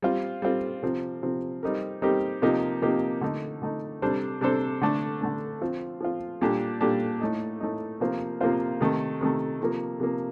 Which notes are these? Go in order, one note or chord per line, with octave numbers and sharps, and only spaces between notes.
G3 C4 F4
G3 C4 F4
C3 F3 C4
C3 F3 C4
G3 C4 D#4 G4 A#4
G3 C4 D#4 G4 A#4
C3 F3 A#3 D#4 G4
C3 F3 A#3 D#4 G4
D3 A3 D#4
D3 A3 D#4
C3 G3 D4 A4 C5
C3 G3 D4 A4 C5
D3 A3 D4
D3 A3 D4
F3 C4 F4
F3 C4 F4
A#2 G3 D4 G4
A#2 G3 D4 G4
A2 A3 D#4
A2 A3 D#4
C3 F3 A#3 F4 C5
C3 F3 A#3 F4 C5
C3 D#3 A3
C3 D#3 A3
C3 F3 A#3
C3 F3 A#3